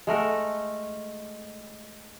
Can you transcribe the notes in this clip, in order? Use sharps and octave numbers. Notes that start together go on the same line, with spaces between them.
G#3 A3 A#4 F#5